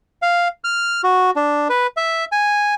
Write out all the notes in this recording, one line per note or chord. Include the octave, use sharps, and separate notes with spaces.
F5
F6
F#4
D4
B4
E5
G#5